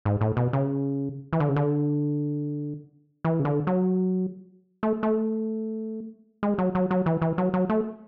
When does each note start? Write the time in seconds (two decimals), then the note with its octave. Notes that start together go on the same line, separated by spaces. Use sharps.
0.05 G#2
0.21 A2
0.37 B2
0.53 C#3
1.33 E3
1.40 D3
1.49 C#3
1.56 D3
3.25 E3
3.40 C#3
3.45 D3
3.67 F#3
4.83 A3
5.03 A3
6.43 G#3
6.58 F#3
6.75 F#3
6.91 F#3
7.06 E3
7.22 E3
7.38 F#3
7.54 F#3
7.69 A3